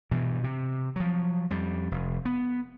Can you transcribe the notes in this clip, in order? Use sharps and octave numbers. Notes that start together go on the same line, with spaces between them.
G2 B2 E3
C3
F3 F#3
F2 G3
F1
B3